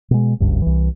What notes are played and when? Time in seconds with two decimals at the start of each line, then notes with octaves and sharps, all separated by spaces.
0.11 B2 G#3
0.40 F#1 C#2 G2
0.62 C2 E3